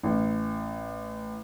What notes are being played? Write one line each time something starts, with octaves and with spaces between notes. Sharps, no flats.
A1